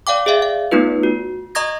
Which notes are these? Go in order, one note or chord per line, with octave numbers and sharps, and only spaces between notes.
D5 F5 G5 D6
G#4 D5 E5 F5
F5
A3 B3 D#4 F4 B4
F#4
D#5 A#5 C#6 D#6 G#6 A#6